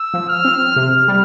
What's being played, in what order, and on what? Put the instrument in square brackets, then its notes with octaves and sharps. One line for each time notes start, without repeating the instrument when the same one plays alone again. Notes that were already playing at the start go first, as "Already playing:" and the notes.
Already playing: [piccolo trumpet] E6
[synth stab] F3
[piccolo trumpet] F6
[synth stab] C4
[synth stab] C3 [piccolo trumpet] F6
[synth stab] G3